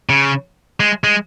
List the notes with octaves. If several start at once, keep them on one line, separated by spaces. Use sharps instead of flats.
C#3
G#3
G#3